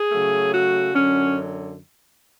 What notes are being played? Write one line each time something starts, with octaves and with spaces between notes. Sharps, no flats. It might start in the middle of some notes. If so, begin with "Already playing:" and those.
Already playing: G#4
C#3 F#3 A3
F#4
F#2 D3 F#3 C#4